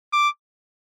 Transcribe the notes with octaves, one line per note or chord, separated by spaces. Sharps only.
D6